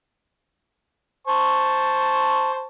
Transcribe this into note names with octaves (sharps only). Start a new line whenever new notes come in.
C5 A5 C#6